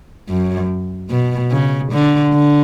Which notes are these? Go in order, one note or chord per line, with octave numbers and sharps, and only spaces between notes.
F#2
B2
C#3
D3
D3